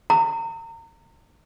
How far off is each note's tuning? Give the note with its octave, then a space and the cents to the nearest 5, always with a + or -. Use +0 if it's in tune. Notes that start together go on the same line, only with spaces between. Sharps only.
A#5 -35